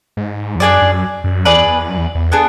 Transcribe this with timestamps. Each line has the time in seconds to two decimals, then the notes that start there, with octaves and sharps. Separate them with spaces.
0.17 G#2
0.55 E2
0.60 F#2 D4 G#4 D5
0.82 F#2
1.24 F#2
1.45 E2 G#4 B4 D5
1.89 F#2
1.98 E2
2.15 E2
2.32 B3 D4 G#4